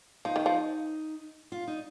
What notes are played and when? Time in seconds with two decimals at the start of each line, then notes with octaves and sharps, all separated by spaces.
0.25 F3 D#4
0.36 D#3
0.46 F3
1.52 F4
1.68 D#4